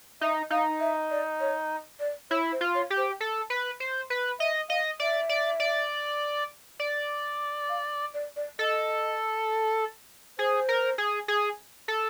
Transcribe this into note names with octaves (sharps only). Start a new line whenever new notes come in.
D#4 E5
D#4 F5
E5
D5
C#5
D5
E4 C#5
C5
F4
C#5
G4
C5
A4
B4
C5
B4
D#5 E5
D#5 F5
D5 E5
D5
D5
D5
F5
D5
D5
A4 D#5
G#4 C5
A#4
G#4
G#4
A4